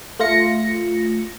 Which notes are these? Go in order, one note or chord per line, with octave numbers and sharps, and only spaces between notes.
A3 F4 A#6 C#7